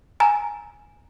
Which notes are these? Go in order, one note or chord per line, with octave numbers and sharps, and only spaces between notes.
G#5 A#5